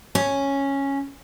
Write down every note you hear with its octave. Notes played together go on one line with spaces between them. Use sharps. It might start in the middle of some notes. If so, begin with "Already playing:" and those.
C#4